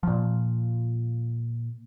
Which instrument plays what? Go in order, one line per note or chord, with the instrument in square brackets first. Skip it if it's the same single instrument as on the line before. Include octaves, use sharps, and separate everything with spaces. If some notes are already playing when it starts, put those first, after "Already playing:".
[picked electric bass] A#2 F3